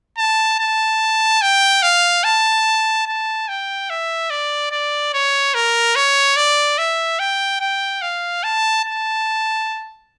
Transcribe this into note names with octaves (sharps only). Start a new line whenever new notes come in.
A5
A5
G5
F5
A5
A5
G5
E5
D5
D5
C#5
A#4
C#5
D5
E5
G5
G5
F5
A5
A5